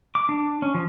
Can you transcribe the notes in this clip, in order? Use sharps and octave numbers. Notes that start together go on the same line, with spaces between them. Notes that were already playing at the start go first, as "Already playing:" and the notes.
D6
D4
C#4
F3